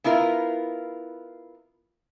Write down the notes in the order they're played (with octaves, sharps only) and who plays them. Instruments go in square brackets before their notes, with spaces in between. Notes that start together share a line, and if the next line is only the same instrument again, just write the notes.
[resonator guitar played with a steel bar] B3 E4 F4 A#4